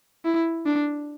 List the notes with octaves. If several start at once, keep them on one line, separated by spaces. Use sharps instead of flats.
E4
D4